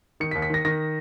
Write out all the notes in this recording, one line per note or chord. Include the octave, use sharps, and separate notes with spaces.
D#3 C#7
B6
D#2
B6
D#3 A#6
D#3 A#6